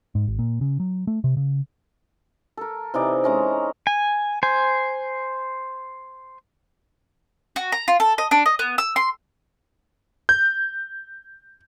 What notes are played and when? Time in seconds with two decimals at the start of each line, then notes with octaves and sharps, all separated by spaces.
0.15 G#2
0.27 G#1
0.39 A#2
0.61 C#3
0.80 F#3
1.07 A3
1.24 C3
1.37 C#3
2.57 A4 A#4
2.94 C3 E3 D#4 D5
3.24 G#3 C#4 A#5
3.87 G#5
4.43 C5 G#5
7.56 F#4
7.72 A#5
7.88 F4
8.00 A4
8.18 D#5
8.31 D4
8.46 D#5
8.59 B3
8.78 E6
8.96 C6
10.29 G6